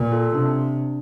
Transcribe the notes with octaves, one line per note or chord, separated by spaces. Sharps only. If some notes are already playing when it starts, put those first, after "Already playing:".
Already playing: A#2
F4 A4
C3 D4